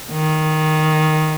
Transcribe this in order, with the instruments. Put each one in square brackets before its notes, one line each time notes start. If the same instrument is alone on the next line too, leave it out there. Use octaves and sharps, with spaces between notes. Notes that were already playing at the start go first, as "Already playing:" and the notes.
[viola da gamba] D#3